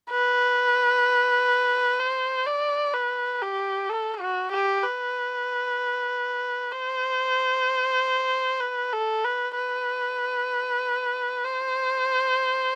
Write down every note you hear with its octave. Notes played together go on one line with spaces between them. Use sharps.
B4
C5
D5
B4
G4
A4
F#4
G4
B4
C5
B4
A4
B4
B4
C5